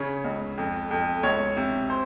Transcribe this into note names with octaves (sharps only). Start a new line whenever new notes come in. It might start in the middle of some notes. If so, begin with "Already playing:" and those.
Already playing: C#3 C#5
C#2
F2
F2
C#2 C#5
C3
C5